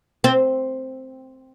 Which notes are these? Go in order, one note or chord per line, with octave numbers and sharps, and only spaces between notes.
C4